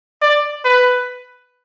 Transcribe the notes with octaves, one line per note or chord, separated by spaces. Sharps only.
D5
B4